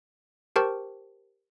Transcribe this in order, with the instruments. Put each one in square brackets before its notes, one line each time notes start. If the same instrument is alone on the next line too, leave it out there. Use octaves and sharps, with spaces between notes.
[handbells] G4 A#4 C5 G5 A5 C#6